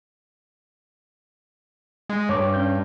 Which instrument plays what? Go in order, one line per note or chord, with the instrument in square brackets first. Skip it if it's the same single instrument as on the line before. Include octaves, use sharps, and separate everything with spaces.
[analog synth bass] G#3
[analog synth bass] G2 [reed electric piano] C#5 D6
[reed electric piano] C#4 G6